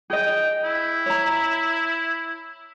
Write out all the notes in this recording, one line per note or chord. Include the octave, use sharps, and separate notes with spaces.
G#4 D#5 G5
E4
C#5 A#5